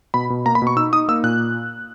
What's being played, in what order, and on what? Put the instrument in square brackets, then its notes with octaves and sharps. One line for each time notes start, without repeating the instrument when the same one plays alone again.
[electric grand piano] B2 B5
B2
A#3 A#5
B5
B2
C#6
D#4 E6
D#4 D#6
A#3 E6
A#2 F#6